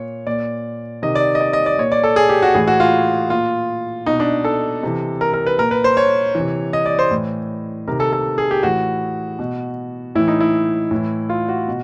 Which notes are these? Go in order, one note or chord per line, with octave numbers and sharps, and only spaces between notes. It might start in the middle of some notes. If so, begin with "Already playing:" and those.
Already playing: A#2 C#5
A#2 D5
C3 D#3 D#5
D5
D#5
D5
D#5
D5
A#2 C#5
D5
A4
G#4
G4
F#4
A2 E3 G#4
F#4
F4
A#2 F4
B2 D#4
D4
A4
C3 E3
A#4
A#4
B4
A#2 A#4
B4
C5
C#5
C3 E3
D#5
D5
C5
A2 E3
C3 D#3 A#4
A4
A4
G#4
G4
A2 E3 F#4
B2
A2 E3 E4
D#4
E4
A2 E3
F4
F#4
B2